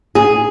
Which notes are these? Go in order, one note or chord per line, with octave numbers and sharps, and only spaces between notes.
G#4